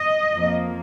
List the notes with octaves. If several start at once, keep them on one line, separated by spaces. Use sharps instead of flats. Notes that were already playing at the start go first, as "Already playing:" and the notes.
Already playing: D#5
F2 F3 A#3